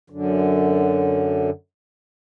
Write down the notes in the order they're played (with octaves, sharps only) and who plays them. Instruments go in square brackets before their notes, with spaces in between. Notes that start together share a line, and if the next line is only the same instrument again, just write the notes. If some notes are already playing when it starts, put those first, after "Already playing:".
[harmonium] F#2 D3